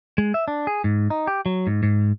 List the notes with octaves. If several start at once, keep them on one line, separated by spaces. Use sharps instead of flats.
G#3
E5
D4
G#4
G#2
D#4
G4
F#3
G#2
G#2